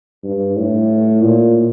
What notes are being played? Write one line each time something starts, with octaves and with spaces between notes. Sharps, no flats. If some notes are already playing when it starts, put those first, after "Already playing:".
G2
A2
A#2